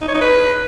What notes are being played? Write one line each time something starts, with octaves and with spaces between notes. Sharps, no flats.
D#4
C#5
D#4
B4